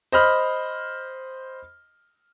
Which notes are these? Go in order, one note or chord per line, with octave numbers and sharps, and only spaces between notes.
C5 D#5 B5 F6